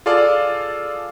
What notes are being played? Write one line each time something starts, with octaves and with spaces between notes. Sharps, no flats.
F4 G#4 A4 D5 F5